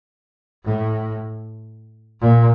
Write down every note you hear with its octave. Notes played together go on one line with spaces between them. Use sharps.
A2
A#2